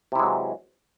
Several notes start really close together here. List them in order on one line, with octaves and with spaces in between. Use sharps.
C3 E4 G#3 F#3 E3